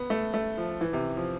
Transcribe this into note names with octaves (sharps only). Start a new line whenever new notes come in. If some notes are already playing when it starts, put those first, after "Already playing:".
Already playing: B3
A3
A3
F3
E3
C3
F3